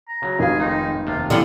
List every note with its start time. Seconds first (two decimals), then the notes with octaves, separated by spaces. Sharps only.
0.08 A#5
0.22 C#3 F#3
0.39 F1 G#4 F5
0.60 D#3 G#3 D#4
1.07 D#2 C3 F4
1.30 A1 D3 F3 B3 F5